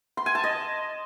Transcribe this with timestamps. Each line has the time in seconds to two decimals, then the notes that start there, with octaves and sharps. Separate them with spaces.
0.17 C6
0.26 G#5
0.35 A5
0.44 D#5